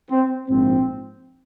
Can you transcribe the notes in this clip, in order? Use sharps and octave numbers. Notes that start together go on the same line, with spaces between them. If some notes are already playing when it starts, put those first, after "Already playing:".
C4
A#1 G#2 F3 C4